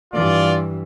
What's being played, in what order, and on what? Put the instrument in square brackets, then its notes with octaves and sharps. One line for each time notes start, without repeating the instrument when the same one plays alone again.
[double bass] G2 E3 [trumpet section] F4 D5